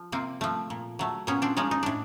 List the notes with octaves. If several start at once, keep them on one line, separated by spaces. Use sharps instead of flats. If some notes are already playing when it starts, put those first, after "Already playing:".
Already playing: F3
C3 A#3 C4
F3 A3
A#2
F#3 A3
A#2 B3 C#4
C4 D4
F3 G#3 C#4 D#4
D#4
A2 D4